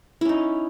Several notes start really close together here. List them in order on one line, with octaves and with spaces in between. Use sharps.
E4 C#4 D#4